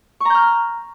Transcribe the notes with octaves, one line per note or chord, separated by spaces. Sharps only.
A#5 C#6 F6 G6